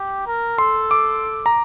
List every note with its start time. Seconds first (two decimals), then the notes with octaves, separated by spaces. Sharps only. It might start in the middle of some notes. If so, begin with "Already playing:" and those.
Already playing: G4
0.27 A#4
0.58 A4 C6
0.91 D6
1.46 A#5